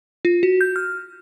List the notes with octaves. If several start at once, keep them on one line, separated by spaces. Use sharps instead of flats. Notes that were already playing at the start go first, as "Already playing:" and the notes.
F4
F#4
G6
F6